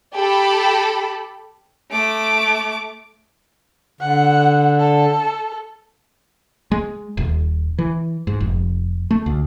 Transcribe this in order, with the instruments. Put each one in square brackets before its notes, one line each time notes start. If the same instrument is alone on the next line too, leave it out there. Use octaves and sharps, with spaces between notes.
[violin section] G4 A4 B5
[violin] A3 D6
[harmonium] D3 [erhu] F#5
[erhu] A4
[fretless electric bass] G#3
D#1
E3
G#2
F1
A3
D2